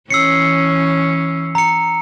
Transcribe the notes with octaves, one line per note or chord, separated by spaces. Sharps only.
E3 C#4 E6 C7 C#7
A#5 C#7